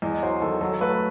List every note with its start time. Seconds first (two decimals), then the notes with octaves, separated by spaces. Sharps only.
0.02 E2 D#5
0.22 F#3 C5
0.42 D#3 A4
0.61 F#3 A4
0.81 A3 B4